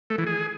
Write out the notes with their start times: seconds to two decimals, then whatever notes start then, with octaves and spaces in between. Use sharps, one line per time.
0.10 A3
0.18 E3
0.27 G#4